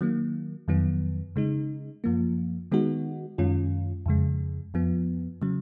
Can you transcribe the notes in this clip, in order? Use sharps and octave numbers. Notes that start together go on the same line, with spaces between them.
D#3 F#3 A#3
F2 D#3 F#3 B3
C#3 G#3 D#4
F#2 F3 A#3
D#3 G#3 B3 D#4 F#4
F#2 D#3 G#3 C#4 F4
F2 C#3 G#3
F2 F3 B3
C#3 F#3